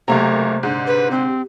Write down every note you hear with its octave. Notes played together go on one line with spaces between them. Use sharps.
F#1 C3 A3 A#3 A#5
G#2 D3
B4
C4